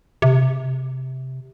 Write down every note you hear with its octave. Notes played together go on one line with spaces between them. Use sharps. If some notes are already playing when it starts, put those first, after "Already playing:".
C3